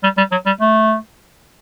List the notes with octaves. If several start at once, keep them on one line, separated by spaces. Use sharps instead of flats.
G3
G3
F#3
G3
A3